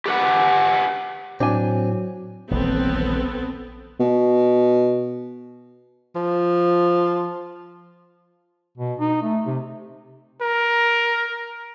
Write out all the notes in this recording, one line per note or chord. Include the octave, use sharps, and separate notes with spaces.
G4 B4 F#5
A2 F#3 C4 D4 G#5
D#1 A#1 E3 B3 C4 A4
B2
F3
B2
D#4
A3
C3
A#4